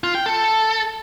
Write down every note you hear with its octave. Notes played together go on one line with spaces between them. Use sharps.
F4
G5
A4